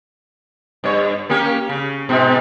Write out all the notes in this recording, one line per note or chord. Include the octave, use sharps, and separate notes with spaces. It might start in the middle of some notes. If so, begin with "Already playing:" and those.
G2 C#5
A#3 C#4 G4
C#3
G#2 B2